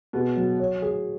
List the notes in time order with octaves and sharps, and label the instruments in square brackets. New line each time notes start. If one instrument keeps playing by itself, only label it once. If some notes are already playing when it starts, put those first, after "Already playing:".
[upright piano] B2 [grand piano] G#4
[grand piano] F#3
C#5
G#4